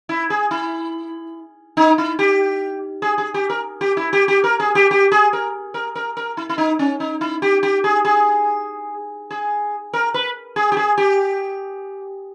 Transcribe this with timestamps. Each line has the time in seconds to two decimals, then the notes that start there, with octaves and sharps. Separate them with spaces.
0.09 E4
0.30 G#4
0.51 E4
1.77 D#4
1.98 E4
2.19 G4
3.02 G#4
3.18 G#4
3.34 G4
3.50 A#4
3.81 G4
3.97 E4
4.13 G4
4.28 G4
4.44 A#4
4.60 G#4
4.75 G4
4.91 G4
5.12 G#4
5.33 A#4
5.74 A#4
5.95 A#4
6.17 A#4
6.37 E4
6.49 E4
6.58 D#4
6.79 C#4
7.00 D#4
7.21 E4
7.42 G4
7.63 G4
7.84 G#4
8.05 G#4
9.31 G#4
9.93 A#4
10.14 B4
10.56 G#4
10.72 G4
10.77 G#4
10.98 G4